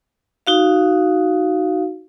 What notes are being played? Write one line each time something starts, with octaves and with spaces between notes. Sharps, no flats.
D#4 F#4 F5